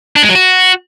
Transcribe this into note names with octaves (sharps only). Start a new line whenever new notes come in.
D4
G#3
F#3
F#4